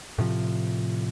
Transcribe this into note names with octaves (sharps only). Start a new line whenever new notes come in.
A2 C3 F3